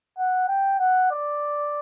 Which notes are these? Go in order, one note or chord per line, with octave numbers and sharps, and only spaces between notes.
F#5
G5
F#5
D5